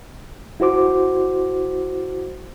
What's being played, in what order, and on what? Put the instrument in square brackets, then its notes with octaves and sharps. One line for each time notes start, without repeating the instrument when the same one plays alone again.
[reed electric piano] E4 F#4 C5 D6